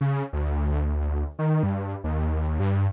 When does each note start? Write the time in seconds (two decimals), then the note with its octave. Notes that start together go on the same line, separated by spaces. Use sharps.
0.01 C#3
0.33 D2
1.39 D#3
1.63 G2
2.04 D#2
2.60 G2